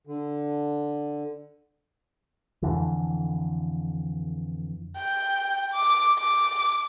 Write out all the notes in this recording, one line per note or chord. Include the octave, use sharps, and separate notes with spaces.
D3
F2 D3 E3
G5
D6
D6